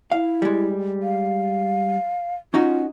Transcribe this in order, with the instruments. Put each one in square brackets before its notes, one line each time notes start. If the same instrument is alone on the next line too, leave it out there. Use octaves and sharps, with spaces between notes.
[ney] E4 [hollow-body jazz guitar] F5
[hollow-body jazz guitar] G3 G#3
[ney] F5
[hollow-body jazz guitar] C#4 D#4 F#4 [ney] F4